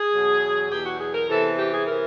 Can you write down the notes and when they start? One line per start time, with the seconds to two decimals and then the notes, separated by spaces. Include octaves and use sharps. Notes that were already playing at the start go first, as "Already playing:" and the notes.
Already playing: G#4
0.14 E2 B2 F#3
0.72 E2 B2 F#3 G4
0.86 F#4
1.00 G#4
1.15 A#4
1.29 E2 C3 E3 A4
1.59 G4
1.73 G#4
1.87 C3 E3 A#4